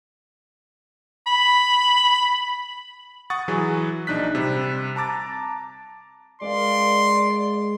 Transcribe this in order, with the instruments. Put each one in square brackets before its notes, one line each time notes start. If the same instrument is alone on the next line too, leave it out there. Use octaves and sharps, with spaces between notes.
[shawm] B5
[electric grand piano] F#5 C#6 D#6 A6
E3 F#3 G#4 B4
A#1 D4 D#4 F#6 B6
C3 G3
A5 A#5 D6 A6
[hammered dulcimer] G#3 B4 F5 [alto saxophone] D5 [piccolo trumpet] C6